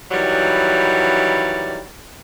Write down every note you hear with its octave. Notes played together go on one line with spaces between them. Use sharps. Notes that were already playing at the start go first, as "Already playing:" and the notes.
D#3 E3 F#3 G3